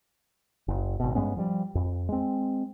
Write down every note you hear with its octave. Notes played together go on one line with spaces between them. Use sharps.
F#1
G#1 B2
G2 G#3 B3 C#4
F3 G3
F2
G#3 C4